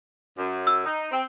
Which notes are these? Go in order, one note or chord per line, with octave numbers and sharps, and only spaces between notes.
F#2
E6
D#4
C4